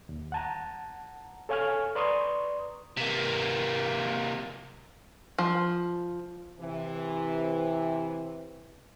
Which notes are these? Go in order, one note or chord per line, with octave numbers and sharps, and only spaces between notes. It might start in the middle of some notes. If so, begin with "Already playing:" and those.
D#2
F#5 A5 A#5
A4 C#5 F5 G#5 C#6 F6
B4 D5 A#5 C6 C#6 D#6
C3 A#3
F3
C3 E3